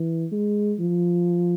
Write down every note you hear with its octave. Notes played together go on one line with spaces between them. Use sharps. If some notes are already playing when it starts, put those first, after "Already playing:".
Already playing: E3
G#3
F3